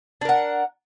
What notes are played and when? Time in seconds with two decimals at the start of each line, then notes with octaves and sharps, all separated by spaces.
0.21 D4
0.25 A#4
0.29 F#5